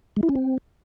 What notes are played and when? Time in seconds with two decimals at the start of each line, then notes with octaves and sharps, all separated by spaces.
0.17 G#3
0.23 E4
0.29 C#4
0.35 C4